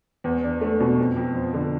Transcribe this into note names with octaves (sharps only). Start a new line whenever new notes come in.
E2
D4
A3
B2
F2
F2
F3
D3